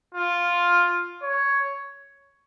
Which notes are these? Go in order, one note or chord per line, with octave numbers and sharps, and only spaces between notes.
F4
C#5